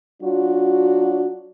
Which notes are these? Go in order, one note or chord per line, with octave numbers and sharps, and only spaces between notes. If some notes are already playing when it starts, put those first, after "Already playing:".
F#3 D4 F4 F#4